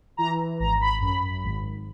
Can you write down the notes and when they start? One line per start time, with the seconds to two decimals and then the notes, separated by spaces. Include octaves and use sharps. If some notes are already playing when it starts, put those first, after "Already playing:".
0.17 E3 A#5
0.59 G#1 A#5
0.81 B5
1.01 F#2 B5
1.43 G#1